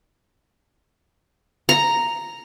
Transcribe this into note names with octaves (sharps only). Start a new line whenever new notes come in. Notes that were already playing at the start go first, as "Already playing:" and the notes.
A#5